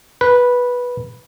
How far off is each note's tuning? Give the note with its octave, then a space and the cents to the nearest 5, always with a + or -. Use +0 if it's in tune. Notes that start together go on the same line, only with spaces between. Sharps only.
B4 -10